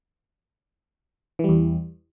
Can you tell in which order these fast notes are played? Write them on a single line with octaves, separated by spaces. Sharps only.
E3 G3 E2